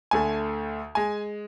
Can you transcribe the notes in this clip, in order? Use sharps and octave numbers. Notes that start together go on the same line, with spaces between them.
D2 D3 A3 G#5
G#3 G#5